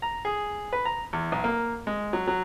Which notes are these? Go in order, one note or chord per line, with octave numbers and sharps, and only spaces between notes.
A#5
G#4
B4
A#5
E2
B1
A#3
G#3
F#3
F#3